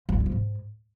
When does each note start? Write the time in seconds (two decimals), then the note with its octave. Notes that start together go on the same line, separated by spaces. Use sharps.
0.09 F3
0.14 G2
0.20 D3
0.26 F3
0.32 G#2